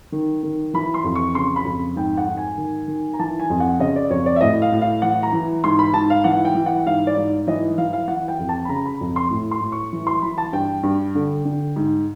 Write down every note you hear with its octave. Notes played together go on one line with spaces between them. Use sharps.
D#3
D#3
E3 B5
C6
F2
C#6
C#3 C6
B5
F2
G#2 G5
F#5
G#2
G#5
D#3
D#3
A#5
E3 A5
G#5
F2
F#5
C#3 D#5
D5
F2 C#5
D5
E5
A2 D#5
F5
A2
F5
E3 F#5
A#5
E3
G#2 C6
B5
G#2 A5
F5
E3 F#5
G5
E3
F#5
G#2 F5
D5
G#2
E3 D#5
E3 F5
F5
E3 F#5
G5
F2
A5
B5
C#3 A#5
B5
F2
C6
A2
C6
A2
C#6
E3
C6
E3 B5
A5
G2 G5
G2
D3
D3
G#2